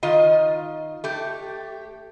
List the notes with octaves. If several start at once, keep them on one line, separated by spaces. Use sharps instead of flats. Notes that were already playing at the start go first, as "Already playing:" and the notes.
D#3 F4 D#5
A3 G4